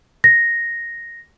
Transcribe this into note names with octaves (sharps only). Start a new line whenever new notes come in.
A#6